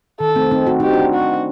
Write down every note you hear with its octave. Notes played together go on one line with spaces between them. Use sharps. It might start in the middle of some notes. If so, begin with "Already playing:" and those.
D#3 A4
A3 C4
C4 D#4
F#4
D#4 G4
D4 F#4
F#4